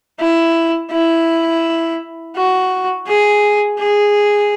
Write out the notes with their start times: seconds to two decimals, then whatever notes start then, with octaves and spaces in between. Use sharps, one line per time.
0.20 E4
0.92 E4
2.36 F#4
3.07 G#4
3.79 G#4